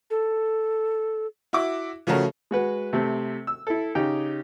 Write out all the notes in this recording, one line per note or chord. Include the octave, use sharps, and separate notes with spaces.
A4
E4 F#4 E5 D6
C#3 F3 A3 C#4 F#4 A#4
G#3 F#4 B4 F#5
C3 A3 C4
E6
E4 A4
C#3 D#4 G4 G5